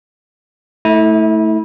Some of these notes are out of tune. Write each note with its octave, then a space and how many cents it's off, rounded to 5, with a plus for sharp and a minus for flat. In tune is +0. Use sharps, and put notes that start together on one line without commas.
A3 +0 E4 -30